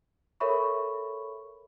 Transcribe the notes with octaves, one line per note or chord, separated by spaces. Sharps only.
A4 A#4 C#5 E5 B5 C#6